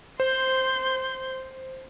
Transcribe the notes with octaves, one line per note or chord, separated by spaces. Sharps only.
C5 C6 G6